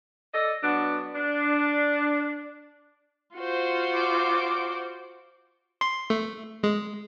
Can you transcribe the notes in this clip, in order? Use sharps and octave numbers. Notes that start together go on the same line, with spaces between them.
A4 D5 D#5
F#3 B3 D4
D4
F4 F#4 C5
D6
C6
A3
G#3